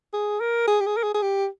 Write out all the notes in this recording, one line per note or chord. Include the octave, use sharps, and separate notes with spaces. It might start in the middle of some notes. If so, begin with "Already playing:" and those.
G#4
A#4
G#4
G4
G#4
A#4
G#4
G#4
G4